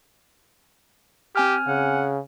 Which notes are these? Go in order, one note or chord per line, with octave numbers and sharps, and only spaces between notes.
C4 G4 G#5 F6
C#3 F#5